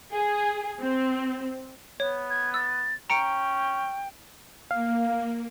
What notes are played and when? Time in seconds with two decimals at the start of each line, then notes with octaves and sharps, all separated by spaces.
0.13 G#4
0.81 C4
2.00 B3 C#5
2.30 G#6
2.54 E6 A6
3.10 C#4 G5 A#5 C#7 D7
4.71 A#3 F5